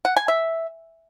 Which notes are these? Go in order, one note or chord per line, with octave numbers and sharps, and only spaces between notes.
F#5
G#5
E5